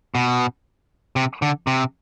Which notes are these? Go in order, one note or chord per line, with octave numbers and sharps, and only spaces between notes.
B2
C3
D3
C3